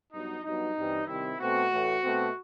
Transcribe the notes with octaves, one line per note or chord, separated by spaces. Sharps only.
G2 F#3 B3 D#4
G2 F#3 B3 D#4
G2 E3 G3 C4
C3 D#3 G3 C4 E4
B2 A3 C4 F#4
A2 E3 A3
B2 A3 C4